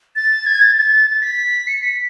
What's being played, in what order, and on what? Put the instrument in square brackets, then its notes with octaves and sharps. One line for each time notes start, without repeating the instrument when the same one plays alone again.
[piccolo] A6
G#6
A6
A6
A6
B6
C#7
B6